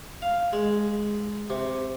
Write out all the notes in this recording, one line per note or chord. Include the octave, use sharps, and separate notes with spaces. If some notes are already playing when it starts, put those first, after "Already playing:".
F5
G#3
C3